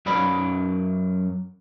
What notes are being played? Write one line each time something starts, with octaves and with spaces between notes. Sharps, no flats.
F#2 F#3 D5 B5